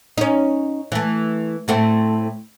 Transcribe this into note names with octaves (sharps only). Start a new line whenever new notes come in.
C#4 D#4
E3 A3
A2 A3 C4